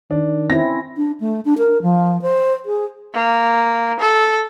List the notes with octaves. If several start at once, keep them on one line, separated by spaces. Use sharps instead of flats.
D#3 D4
C4 C#4 E4 A#6
D4
A3
D4
A#4
F3
C5
G#4
A#3
A4